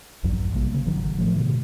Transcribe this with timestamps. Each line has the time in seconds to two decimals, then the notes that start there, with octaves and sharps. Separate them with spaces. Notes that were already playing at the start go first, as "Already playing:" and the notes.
0.23 A#1 E2 G2 F#3
0.52 A#1 C3 G3 A#3
0.73 C#3 A#3
0.85 G1 G#2 D#3 F#3
1.18 A2 F3 A3
1.36 G#2 B2 D3 D#3